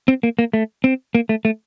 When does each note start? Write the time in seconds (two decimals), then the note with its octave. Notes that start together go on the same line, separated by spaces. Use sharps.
0.08 C4
0.23 A#3
0.39 A#3
0.53 A3
0.84 C4
1.15 A#3
1.29 A3
1.45 A3